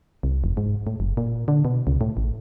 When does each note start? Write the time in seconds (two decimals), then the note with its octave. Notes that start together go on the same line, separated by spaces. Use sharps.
0.23 C2
0.44 F1
0.57 G#2
0.87 A2
1.00 F#1
1.17 A#2
1.48 D3
1.65 B2
1.87 C#2
2.01 A2
2.17 A1